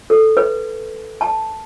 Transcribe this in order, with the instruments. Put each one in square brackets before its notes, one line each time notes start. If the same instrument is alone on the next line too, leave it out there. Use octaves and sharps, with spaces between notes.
[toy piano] A4
B4
A5